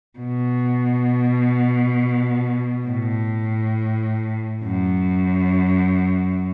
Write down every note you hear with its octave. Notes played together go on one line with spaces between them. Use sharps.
B2
A2
F#2